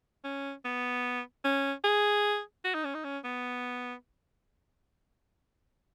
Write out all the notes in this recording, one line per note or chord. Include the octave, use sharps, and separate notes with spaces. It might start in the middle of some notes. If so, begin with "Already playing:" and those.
C#4
B3
C#4
G#4
F#4
D#4
C#4
D#4
C#4
B3